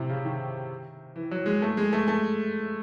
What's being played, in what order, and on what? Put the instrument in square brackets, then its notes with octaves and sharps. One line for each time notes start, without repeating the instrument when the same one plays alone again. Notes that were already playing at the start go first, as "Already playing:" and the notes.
Already playing: [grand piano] A2 C3
C#3
D#3
E3
F#3
G#3
A3
G#3
A3
A3